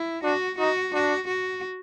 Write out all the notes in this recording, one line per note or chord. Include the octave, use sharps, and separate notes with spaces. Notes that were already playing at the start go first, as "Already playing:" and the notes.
Already playing: E4
D4 F#4
D#4 F#4
D4 F#4
F#4